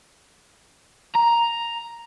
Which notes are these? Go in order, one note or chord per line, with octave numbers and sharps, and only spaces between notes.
A#5